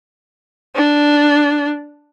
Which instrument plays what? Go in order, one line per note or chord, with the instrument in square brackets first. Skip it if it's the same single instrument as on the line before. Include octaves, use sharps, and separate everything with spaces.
[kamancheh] D4